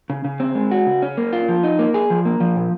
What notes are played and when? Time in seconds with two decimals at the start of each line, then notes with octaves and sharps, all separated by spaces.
0.10 C#3
0.25 C#3
0.40 C4
0.55 G#3
0.71 F#4
0.86 C#3
1.02 C#4
1.17 A#3
1.33 F4
1.48 F3
1.64 D#4
1.79 A#3
1.94 G#4
2.10 F3
2.25 A#3
2.40 F3
2.56 A#2